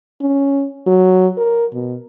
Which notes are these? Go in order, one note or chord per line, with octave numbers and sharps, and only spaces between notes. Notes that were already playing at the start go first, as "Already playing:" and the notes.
C#4
F#3
A#4
B2